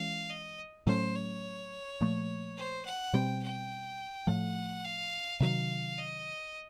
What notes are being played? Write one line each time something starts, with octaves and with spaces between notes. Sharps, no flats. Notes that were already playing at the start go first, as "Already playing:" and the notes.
Already playing: E3 G#3 C#4 F5
D#5
A2 F#3 A3 C#4 C5
C#5
A#2 F3 A3
C5
F#5
B2 G3 C4 G5
G5
A2 F3 A3 F#5
F5
C3 D#3 F#3 F5
D#5